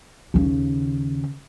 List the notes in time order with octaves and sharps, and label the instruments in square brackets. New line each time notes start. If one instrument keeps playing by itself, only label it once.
[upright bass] D#2 C#3